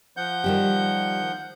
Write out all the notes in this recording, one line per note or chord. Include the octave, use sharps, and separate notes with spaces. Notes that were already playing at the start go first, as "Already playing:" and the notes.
F3 F#5 G6
D#3 G3 G4